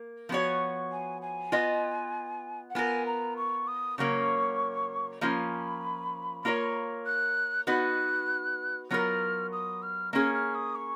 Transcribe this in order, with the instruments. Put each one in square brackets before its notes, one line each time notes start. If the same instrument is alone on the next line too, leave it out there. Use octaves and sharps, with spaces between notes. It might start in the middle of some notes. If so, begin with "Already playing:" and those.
Already playing: [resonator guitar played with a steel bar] A#3
F3 B3 F#4 C#5
[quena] G#5
G#5
[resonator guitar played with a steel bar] B3 F4 B4 D#5
[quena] F#5
[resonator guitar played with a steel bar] B3 F4 A#4 [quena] G#5
[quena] A#5
C#6
D#6
[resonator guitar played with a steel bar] C#3 F#3 A#3 C#4 [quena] C#6
[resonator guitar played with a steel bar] F3 A#3 C#4 F4 [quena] B5
[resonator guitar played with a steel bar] A#3 F4 A#4 C#5
[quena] F#6
[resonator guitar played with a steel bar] B3 D#4 F#4 B4 [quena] F#6
[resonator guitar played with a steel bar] F#3 B3 F4 A#4 [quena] F6
[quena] D#6
F6
[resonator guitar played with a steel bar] A#3 C#4 G#4 [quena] F6
[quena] F6
D#6
C#6